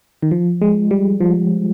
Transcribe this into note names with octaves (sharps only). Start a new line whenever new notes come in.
D#3
F3
G#3
G3
F3